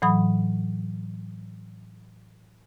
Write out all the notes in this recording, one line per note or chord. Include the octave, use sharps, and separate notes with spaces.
A2 E3 F#3 B5 D#6